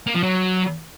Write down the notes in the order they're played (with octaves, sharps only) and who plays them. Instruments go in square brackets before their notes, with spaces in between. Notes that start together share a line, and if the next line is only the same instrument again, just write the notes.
[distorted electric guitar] A#3
F3
F#3